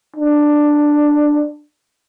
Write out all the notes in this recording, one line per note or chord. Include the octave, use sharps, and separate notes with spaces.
D4